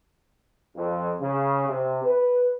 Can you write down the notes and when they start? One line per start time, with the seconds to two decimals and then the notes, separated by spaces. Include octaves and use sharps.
0.76 F2
1.21 C#3
1.69 C3
2.05 B4